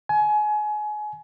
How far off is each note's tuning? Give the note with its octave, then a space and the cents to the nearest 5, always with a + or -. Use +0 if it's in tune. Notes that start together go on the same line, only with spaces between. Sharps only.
G#5 +30